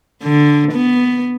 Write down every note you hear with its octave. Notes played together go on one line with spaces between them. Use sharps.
D3
B3